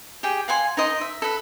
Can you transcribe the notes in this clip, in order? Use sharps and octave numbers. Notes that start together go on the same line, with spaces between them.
G4 G#4 G5
F5 F#5 G#5 C6
D#4 A#4 D#5 C6
E5
A4 B4